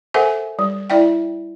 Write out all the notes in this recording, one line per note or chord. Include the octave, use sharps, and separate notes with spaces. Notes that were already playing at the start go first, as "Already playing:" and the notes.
A4 A#4 C5 E5 F#5 G#5
G3
E4 D5 E5 G5